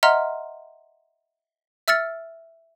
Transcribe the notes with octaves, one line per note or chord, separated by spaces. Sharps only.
D#5 E5 F#5 A#5 C6 F6
E5 E6 F6 A6 C#7